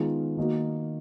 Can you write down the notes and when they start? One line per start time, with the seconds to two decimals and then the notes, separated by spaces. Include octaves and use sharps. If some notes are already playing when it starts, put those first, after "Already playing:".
Already playing: D#3 G#3 B3 F4
0.37 D#3 A#3 D#4 F#4